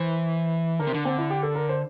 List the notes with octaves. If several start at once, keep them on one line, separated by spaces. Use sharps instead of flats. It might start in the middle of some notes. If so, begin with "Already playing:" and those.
Already playing: E3 C5
D3 A#4
C3
D3 D4
C4
E4
G4
A4
A#4
C5